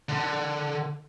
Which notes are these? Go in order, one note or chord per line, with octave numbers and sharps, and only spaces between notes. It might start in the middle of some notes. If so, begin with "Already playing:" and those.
D3